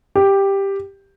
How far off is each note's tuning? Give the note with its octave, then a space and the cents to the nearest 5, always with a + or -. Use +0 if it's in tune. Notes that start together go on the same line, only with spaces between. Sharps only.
G4 +5